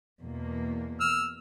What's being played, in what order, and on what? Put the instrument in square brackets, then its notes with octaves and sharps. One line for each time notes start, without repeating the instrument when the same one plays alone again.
[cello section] E2 B2 A#3
[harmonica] E6 F6